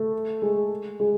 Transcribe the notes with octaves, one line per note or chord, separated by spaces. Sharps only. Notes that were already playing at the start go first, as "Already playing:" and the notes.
Already playing: A3
G#3
G#3